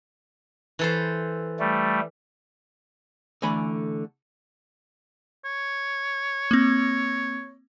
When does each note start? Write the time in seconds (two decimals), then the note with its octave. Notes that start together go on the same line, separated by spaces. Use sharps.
0.79 E3 A4 C5
1.59 G3 A3
3.42 D3 E3 A3 G#5 B5
5.44 C#5
6.51 A#3 C4